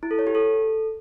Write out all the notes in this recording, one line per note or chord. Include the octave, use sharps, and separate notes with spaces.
E4
A4
C#5
G4
A4